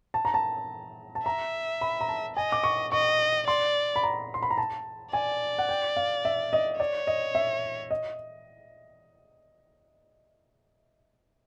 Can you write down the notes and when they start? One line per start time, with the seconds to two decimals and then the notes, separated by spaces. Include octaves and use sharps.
0.14 A5
0.25 A#5
0.34 A5
1.15 A5
1.26 E5 A#5
1.81 B5
2.01 A#5
2.08 A5
2.36 D#5 G#5
2.52 D6
2.64 C#6
2.92 D#5 C#6
3.47 D5 C6
3.96 B5
4.03 A#5
4.34 C6
4.43 B5
4.51 A#5
4.58 A5
5.13 D5 G#5
5.59 F#5
5.69 G5
5.97 F5
6.25 E5
6.53 D#5
6.80 C#5 D5
7.07 D#5
7.35 E5
7.91 D#5